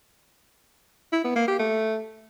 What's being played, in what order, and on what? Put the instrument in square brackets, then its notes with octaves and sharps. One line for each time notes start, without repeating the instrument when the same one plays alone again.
[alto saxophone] E4
B3
A#3
G4
A3